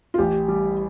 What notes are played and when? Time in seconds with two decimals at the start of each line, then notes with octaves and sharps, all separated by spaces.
0.14 F4
0.18 A1 G4
0.48 G3